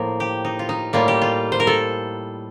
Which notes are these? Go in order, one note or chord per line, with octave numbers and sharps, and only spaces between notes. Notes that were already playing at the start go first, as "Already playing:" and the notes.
Already playing: A2 F3 A#3 A#4
G4
D#4
F4
D#4
A2 G3 A#3 F4
G4
F4
C5
A#4
A4